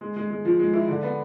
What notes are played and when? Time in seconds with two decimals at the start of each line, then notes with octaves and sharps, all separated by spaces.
0.01 G#3
0.16 G#3
0.30 G#3
0.45 F3
0.59 G#3
0.73 E4
0.88 D3
1.03 B3